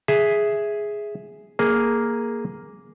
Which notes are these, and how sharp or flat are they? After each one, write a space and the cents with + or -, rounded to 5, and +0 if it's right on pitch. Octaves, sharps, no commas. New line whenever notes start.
G#4 +0 E5 +0
A#3 +0 G#4 +0